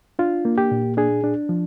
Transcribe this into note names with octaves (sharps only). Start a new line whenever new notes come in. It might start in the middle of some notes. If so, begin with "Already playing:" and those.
D4 F4
A#3
G4
A#2
D4 G#4
D4
F3